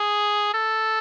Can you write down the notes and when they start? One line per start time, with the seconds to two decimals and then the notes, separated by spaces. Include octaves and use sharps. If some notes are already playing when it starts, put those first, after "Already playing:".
Already playing: G#4
0.54 A4